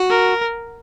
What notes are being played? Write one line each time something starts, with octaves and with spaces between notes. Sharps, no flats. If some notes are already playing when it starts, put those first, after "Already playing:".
Already playing: F#4
A#4